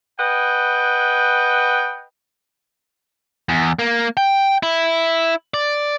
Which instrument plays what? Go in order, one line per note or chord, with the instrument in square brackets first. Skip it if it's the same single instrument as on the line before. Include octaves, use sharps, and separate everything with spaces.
[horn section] B4 D#5 F#5 G5
[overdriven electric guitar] E2
A#3
G5
E4
D5